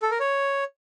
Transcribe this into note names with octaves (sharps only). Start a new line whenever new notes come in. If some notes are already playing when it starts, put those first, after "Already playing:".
A4
A#4
C#5